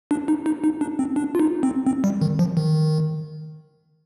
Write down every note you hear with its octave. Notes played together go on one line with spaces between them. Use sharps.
D4
D#4
D#4
D#4
D4
C4
D4
F4
D#4
C4
C4
G3
D#3
F3
D#3